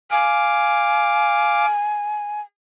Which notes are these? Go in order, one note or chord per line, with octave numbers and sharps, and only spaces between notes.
F5 G#5 D6